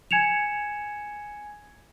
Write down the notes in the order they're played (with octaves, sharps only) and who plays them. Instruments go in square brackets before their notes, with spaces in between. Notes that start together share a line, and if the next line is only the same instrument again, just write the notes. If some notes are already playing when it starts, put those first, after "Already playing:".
[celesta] G#5 G#6 C#7 E7 F7